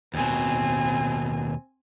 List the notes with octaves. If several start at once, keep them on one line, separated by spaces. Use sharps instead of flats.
D#2 B2 C4 G#5